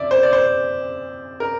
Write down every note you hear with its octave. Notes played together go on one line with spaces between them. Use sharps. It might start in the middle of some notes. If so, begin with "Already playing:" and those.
Already playing: F2 D3 D5 E5
C5
D5
C5
A#4